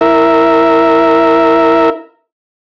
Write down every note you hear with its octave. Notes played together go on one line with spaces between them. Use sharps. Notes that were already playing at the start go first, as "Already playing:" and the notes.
E4 A#4 E5